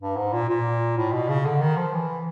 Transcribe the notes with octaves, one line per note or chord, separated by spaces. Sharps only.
G2
G#2
A#2
A#2
A2
B2
C#3
D3
D#3
F3
E3